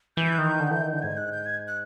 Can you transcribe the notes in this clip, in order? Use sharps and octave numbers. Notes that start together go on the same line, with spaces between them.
E3 G6
D#3
D3
E3
D#3
D3
G#2 G#6
F#6
G6
G#6
F#6